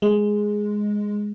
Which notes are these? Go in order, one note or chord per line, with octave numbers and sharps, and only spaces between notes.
G#3